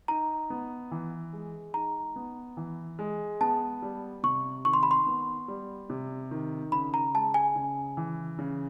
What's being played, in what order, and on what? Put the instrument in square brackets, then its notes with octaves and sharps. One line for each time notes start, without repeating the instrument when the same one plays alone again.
[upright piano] D#4 [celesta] A#5
[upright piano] B3
E3
G#3
[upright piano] D#4 [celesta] A#5
[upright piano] B3
E3
G#3
[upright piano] B3 [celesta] A5
[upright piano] G3
[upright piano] C3 [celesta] C#6
[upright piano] D#3 [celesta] C#6
[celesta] C6
B5
C6
[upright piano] B3
G3
C3
D#3
[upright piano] C#3 [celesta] B5
[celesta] A#5
[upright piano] G#3 [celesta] A5
[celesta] G#5
[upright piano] C#3
E3
C#3